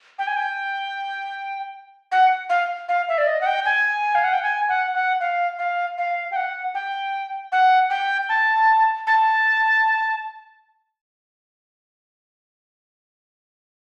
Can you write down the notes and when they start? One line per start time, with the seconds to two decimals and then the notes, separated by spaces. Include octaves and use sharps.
0.19 G5
0.27 G#5
0.36 G5
2.12 F#5
2.50 F5
2.89 F5
3.09 E5
3.18 D5
3.27 D#5
3.41 F#5
3.46 G5
3.65 G#5
4.15 F5
4.24 F#5
4.33 G5
4.43 G#5
4.69 F#5
4.95 F#5
5.20 F5
5.59 F5
5.98 F5
6.31 G5
6.36 F#5
6.75 G5
7.52 F#5
7.90 G5
8.29 A5
9.07 A5